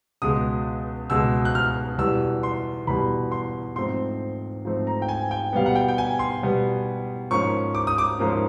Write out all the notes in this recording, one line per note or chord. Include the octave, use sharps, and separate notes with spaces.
C#2 B2 G#3 D#6
C#2 B2 G#3 E6
F#6
F6
E2 B2 G3 E6
C6
E2 B2 G3 B5
C6
G#2 F3 A3 C4 C6
G#2 F3 A3 C4
A#5
G5
G#5
G5
B2 G3 B3 F5
F#5
G5
G5
G#5
C6
B2 G3 B3
G#2 F3 A#3 C#4 C#6
D6
D#6
D6
G#2 F3 A#3 C#4